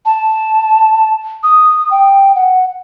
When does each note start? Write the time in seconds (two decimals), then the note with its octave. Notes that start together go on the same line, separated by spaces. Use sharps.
0.06 A5
1.43 D#6
1.91 G5
2.35 F#5